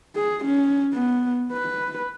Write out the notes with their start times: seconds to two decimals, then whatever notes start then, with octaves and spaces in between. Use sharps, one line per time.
0.15 G#4
0.45 C#4
0.93 B3
1.53 B4